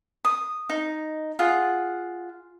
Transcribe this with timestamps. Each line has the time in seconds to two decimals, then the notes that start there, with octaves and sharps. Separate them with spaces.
0.25 D#6
0.69 D#4
1.39 F4 G#4 F#5